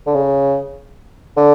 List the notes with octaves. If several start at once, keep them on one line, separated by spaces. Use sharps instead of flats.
D3
C#3
D3